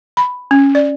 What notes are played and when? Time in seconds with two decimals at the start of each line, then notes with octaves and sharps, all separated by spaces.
0.17 B5
0.51 C#4
0.75 D5